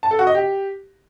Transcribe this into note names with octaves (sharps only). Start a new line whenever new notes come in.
A5
A4
F#4
D#5
G4